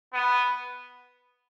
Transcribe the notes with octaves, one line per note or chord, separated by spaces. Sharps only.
B3